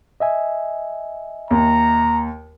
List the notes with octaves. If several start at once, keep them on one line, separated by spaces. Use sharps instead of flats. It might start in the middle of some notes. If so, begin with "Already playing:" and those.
D#5 E5 G#5
D#2 A#5